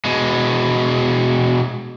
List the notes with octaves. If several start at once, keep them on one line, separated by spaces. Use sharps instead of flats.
B2 G#3